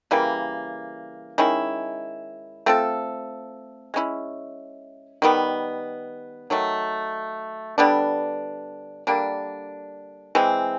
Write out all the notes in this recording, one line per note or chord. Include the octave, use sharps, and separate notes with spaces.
C#3 E3 G3 A#3
D#3 G#3 C#4 E4
A3 C4 F4 A4
G#3 C#4 E4
D#3 G3 B3
D#3 F#3 A3
D3 G3 B3 D4
D3 G3 A#3 D4
E3 G#3 C4